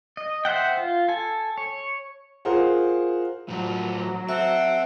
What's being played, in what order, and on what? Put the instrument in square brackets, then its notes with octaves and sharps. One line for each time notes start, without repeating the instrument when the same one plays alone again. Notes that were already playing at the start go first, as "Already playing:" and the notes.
[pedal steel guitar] D#5
C5 E5 F#5 G5
F4
A4 G#5
C#5
[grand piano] F4 G#4 A#4 C5 F#5
[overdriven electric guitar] A2 F3 [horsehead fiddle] F#3
[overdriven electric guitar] C4 [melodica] A4 F#5 [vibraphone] E5